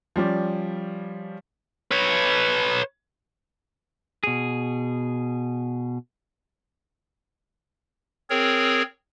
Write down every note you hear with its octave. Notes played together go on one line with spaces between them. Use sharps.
F3 G3 C#4 D5
B4 C#5
B2 G#4
C4 G#4 A#4 C#5